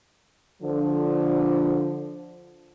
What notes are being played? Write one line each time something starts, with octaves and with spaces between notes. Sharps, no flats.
D3 F3